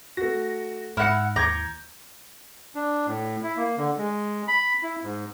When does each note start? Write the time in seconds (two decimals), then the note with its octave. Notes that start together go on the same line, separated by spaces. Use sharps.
0.17 A3 F#4 A#6
0.97 G#2 E4 F#5 F6 A#6 C#7
1.36 D#2 A#5 D6 G6 G#6
2.75 D4
3.07 A2
3.43 E4
3.57 A#3
3.78 D3
3.98 G#3
4.48 B5
4.83 E4
5.04 G#2